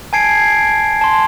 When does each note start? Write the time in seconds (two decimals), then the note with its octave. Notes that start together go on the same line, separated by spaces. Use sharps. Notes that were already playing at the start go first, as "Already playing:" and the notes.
0.13 G#5 A5 G#6 C7 D7
1.01 A5 C6